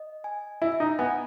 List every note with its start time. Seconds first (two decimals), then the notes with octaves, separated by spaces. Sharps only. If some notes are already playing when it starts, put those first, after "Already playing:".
Already playing: D#5
0.24 G#5
0.62 E4 E5
0.80 D#4
0.99 B3 G#5